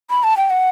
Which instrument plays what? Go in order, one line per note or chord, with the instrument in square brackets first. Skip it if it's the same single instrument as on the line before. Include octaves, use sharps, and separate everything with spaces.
[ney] B5
A5
G5
F#5